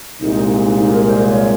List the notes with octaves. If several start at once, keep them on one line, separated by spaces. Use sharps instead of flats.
C2 A#2 G#3 D#4
D#4
D#4
A#4
C5
C#5